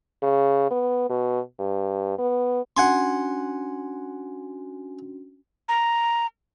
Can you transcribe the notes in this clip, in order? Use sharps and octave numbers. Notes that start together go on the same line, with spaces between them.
C#3
B3
B2
G2
B3
C#4 D4 F#4 F#5 G#5 C6
A#5